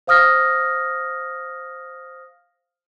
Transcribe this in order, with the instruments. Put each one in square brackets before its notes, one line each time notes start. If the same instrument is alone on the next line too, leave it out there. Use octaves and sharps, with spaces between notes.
[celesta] C5 F5 D#6 F6 A#6